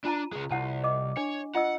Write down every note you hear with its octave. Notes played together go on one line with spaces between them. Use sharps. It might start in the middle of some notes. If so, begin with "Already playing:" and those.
D4 F4 A5 A#5
C#3 G#3
C2 E4 F#5 A5
D#5 D6
D4 C#5
F4 D#5 F#5 E6